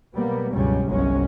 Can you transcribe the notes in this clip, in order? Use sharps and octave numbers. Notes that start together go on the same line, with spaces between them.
B2 F#3 G3 A#3 B3
C#2 G2 B2 F#3 G3 C#4
G1 C2 C3 F#3 G#3 C#4